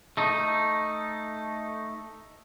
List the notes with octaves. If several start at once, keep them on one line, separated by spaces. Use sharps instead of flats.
A3 D#4